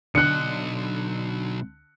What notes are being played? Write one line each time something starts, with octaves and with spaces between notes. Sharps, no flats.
B1 D3 D#5 F#6 C#7